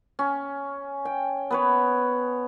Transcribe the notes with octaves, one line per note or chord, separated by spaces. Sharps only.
C#4
G5
B3 B4 C#5